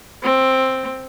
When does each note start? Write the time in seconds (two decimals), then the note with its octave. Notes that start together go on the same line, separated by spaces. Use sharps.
0.23 C4